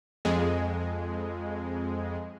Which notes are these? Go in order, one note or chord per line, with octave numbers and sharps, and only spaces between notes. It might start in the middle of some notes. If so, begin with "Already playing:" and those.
F2 G#3